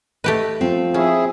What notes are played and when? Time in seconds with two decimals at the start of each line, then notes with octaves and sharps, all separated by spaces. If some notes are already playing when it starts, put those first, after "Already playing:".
0.24 A3 G4 B4 D#5
0.61 F3 C4
0.94 C#4 E4 G#4